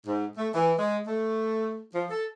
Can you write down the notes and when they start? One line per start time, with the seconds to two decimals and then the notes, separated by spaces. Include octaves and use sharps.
0.06 G#2
0.38 A3
0.54 E3
0.79 G#3
1.08 A3
1.94 F3
2.10 A4